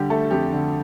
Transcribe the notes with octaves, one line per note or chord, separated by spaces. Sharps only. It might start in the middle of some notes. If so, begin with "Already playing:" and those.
Already playing: D3 G3 G4
A3 A4
F2 G4
D3